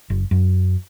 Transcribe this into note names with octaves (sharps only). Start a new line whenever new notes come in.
F#1
F#2